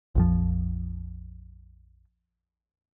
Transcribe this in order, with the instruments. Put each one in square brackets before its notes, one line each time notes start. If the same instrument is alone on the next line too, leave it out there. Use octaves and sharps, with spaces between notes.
[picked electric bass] A#1 F2 F3